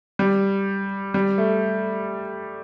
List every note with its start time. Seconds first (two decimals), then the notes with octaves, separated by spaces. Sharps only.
0.19 G3
1.14 G3
1.38 A3